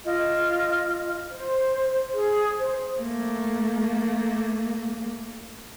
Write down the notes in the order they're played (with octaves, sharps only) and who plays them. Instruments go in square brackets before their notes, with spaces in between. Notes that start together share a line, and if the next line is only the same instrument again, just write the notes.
[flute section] F4 D#5
C5
G#4
C5
[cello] A3 A#3